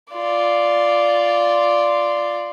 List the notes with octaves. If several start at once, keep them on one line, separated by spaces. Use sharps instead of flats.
F4 D5